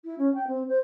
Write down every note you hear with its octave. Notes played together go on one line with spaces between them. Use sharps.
E4
C#4
G5
C4
C5